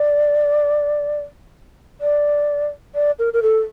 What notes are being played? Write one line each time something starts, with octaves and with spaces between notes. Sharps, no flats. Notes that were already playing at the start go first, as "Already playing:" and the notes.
Already playing: D5
D5
D5
A#4
A#4
A4